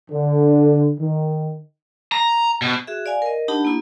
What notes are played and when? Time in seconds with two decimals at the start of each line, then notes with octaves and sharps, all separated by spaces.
0.11 D3
0.99 D#3
2.12 A#5
2.62 B2
2.87 F#4 G#4 E5
3.06 D5 F5 G#5
3.22 A#4 D#5
3.48 D4 D#4 G4 F#5 A5 B5
3.65 A#3 E4